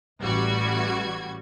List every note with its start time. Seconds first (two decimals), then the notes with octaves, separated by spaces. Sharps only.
0.20 A1 G3 F#4 G#6